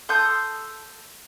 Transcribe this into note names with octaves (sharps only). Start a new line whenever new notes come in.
A4 C6 D#6 G6